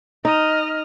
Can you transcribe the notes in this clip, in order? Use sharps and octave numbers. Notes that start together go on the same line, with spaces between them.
D#4 D#5 F6